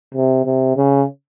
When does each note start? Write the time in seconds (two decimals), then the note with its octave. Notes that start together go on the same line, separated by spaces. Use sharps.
0.14 C3
0.45 C3
0.77 C#3